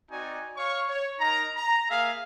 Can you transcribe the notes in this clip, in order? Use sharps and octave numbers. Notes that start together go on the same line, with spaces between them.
C4 D#4 F#4 D5 G#5
C#5 F5 C#6
C#5
D#4 A#4 A#5
A#5
A#3 G#4 E5 F5